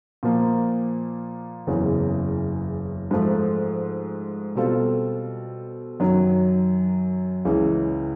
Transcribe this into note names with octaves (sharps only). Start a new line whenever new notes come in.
A#2 F3 A#3
F#1 E2 C#3 E3
G#2 F3 A3
B2 G3 C4 F4 A4
F#2 D#3 F#3
C#2 C#3 E3